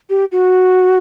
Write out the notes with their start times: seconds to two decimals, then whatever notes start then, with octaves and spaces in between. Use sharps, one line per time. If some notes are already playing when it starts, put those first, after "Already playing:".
0.10 G4
0.32 F#4